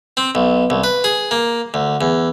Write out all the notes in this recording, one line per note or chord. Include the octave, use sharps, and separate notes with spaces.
C4
B1
C2
B4
G#4
A#3
D2
E2